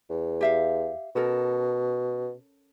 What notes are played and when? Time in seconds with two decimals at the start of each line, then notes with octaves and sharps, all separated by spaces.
0.10 E2
0.41 G4 E5 F5
1.16 B2 C#4 A4 A#4